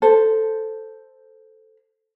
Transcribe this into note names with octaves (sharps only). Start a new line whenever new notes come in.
A4 C5